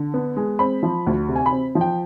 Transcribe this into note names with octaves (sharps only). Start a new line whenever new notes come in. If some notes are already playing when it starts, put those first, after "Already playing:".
Already playing: D3
B3
G#3
C4 B5
F3
D2
C3
G#5
B5
C4
F3
G5